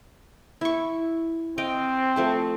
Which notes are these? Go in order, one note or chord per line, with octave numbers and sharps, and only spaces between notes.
E4 C#6
C4 D#5 F5 G5
F3 A3 A5